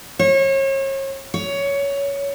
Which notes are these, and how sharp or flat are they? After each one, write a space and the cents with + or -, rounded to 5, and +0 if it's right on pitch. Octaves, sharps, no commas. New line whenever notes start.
C#5 -35
C#5 +15